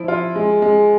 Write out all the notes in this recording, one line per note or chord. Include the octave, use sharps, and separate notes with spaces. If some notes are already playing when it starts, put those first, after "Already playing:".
Already playing: F3 E4
F4
G#3
G#3